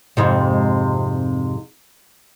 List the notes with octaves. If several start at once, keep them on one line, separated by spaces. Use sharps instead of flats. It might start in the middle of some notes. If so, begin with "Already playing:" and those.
F2 G#2 C3